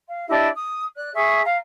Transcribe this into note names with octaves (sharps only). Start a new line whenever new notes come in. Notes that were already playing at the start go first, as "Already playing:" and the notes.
F5
D4 E4 G4 D#5
D#6
D5 F#6
G#4 E5 C#6
F5 A#5